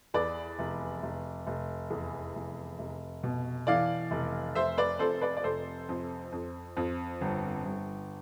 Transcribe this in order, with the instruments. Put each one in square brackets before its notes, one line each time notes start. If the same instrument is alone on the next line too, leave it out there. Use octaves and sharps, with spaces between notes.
[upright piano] E2 B4 D5
F1
F1
F1
E2
F1
F1
B2
E3 D5 F5
F1
F1 C5 E5
B4 D5
F2 A4 C5
B4 D5
D5
F1 A4 C5
F2
F2
F2
G1
G1